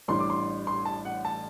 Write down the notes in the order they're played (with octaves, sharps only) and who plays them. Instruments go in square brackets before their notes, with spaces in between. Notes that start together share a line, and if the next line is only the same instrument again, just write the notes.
[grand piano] A1 A2 G3 D4 C6
D6
C6
C6
A5
F#5
A5